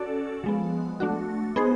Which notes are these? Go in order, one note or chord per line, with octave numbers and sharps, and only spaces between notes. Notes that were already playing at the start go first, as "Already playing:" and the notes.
Already playing: C#4 F#4 A4 D5
F3 G#3 B3
A3 D4 F#4
B3 D#4 G#4 C5